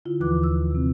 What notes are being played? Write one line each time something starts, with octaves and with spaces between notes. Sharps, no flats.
D3 E4 F4
D#2 E3 F3 B4 D6 F#6
E6
C3 C4